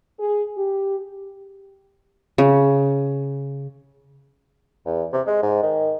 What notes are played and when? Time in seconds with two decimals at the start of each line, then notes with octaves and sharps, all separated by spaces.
0.19 G#4
0.58 G4
2.38 C#3
4.86 E2
5.13 C3
5.26 G#3
5.43 G#2
5.63 D#3